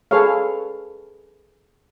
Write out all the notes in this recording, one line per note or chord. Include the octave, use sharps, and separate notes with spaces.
G#4 A4 B4 C#5 F5